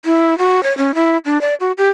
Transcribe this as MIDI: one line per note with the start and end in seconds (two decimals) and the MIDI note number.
0.05 0.37 64
0.38 0.63 66
0.63 0.76 73
0.78 0.95 61
0.95 1.17 64
1.25 1.41 62
1.41 1.55 74
1.60 1.72 66
1.78 1.89 67